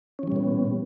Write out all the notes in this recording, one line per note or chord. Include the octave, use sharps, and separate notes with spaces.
A#2 E3 G3 B3 C#4